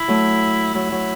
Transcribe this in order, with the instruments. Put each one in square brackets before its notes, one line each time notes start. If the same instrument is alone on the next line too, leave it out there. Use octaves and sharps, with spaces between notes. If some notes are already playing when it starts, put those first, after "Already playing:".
Already playing: [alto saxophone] E4
[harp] F#3 A3
[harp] F#3 [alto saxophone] E4
[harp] F#3